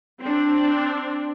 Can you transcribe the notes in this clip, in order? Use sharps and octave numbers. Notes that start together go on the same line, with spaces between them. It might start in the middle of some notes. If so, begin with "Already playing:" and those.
C4 D4